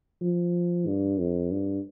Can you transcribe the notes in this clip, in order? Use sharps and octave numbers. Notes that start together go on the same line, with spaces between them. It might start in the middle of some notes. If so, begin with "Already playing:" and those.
F3
G2
F2
G2